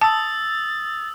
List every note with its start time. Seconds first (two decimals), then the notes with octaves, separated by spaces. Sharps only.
0.01 A5 D#6 E6 A6